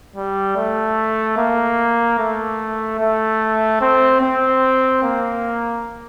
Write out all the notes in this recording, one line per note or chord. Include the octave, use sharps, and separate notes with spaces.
G3
A3
A#3
A3
A3
C4
C4
A#3